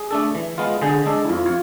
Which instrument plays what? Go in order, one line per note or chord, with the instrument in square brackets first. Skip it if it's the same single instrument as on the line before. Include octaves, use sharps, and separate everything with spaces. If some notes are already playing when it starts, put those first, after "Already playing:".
Already playing: [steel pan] G#4
[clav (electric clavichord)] A3 D4 A4
E3
G#3 B3 F4
[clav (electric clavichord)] D3 [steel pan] G#4
[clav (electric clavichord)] G#3 D4 A4
[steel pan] E4
[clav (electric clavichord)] F2 [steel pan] F4
[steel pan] F4